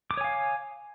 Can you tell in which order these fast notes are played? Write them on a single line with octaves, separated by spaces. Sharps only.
D6 D#6 C#5 G#5 F5